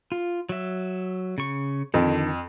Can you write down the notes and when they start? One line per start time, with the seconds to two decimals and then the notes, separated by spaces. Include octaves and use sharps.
0.12 F4
0.49 F#3 E5
1.38 C#3 C#6
1.94 F2 D3 D#3